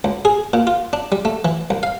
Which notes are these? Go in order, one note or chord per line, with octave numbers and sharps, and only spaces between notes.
C#2
G#4
A#2
F4
D4
G3
A3
E3
C2
F5